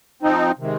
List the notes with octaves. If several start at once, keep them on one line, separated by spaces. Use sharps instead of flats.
F3 C4 D#4
C3 D#3 G#3